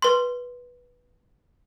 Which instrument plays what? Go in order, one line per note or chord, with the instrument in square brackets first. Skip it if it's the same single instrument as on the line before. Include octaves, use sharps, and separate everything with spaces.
[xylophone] B4 C6